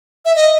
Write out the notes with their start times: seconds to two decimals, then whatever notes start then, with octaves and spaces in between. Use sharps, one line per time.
0.25 E5
0.35 D#5